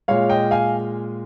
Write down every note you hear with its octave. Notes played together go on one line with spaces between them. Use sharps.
A#2 G#3 C#5 F5
D#5 G5
F5 G#5